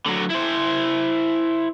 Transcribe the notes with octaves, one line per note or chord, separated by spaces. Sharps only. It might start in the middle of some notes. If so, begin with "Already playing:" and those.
D3 F#3
E4 C5